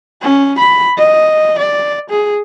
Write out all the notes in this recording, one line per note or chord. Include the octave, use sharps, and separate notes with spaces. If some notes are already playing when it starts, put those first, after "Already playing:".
C#4
B5
D#5
D5
G#4